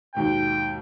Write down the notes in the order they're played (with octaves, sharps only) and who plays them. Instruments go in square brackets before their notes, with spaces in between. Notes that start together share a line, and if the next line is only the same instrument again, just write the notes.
[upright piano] D#2 G#2 B2 [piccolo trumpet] G5